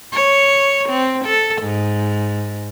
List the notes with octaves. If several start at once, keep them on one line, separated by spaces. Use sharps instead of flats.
C#5
C4
A4
G#2